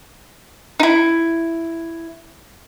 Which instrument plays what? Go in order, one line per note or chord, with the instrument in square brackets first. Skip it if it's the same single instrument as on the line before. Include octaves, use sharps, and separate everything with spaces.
[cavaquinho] D#4 E4